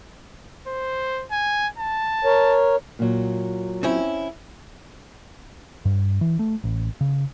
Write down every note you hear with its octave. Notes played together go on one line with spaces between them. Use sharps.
C5
G#5
A5
A#4 C#5
A#2 F#3
C4 C#4 E4
G2
E3
A3
A1
C#3